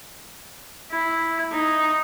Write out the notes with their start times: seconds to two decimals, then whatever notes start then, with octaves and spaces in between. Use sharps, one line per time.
0.91 E4
1.52 D#4